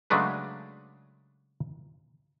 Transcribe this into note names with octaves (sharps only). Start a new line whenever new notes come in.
C#3 F#3 G#3 A3 D4 B4